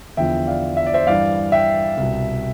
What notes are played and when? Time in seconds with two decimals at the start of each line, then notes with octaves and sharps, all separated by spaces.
0.17 E2 D3 F3 E5 G5
0.47 D5 F5
0.77 E5
0.86 D5
0.94 C5 E5
1.07 G2 E3 D5 F5
1.52 E5 G5
1.98 C2 B2